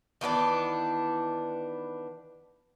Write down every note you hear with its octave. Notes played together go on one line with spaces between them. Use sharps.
D#3 E3 B3 D4